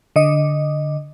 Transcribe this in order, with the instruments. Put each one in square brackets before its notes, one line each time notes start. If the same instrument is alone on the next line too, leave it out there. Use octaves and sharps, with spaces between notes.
[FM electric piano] D3 D#5